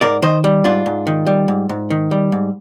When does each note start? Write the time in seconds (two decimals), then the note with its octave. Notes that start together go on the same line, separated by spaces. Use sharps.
0.01 G#2 A#4 D5
0.22 D#3 C5 D#5
0.44 G3
0.64 G#2 D4 F4
0.86 G#2
1.07 D#3
1.26 G3
1.48 G#2
1.69 G#2
1.90 D#3
2.11 G3
2.32 G#2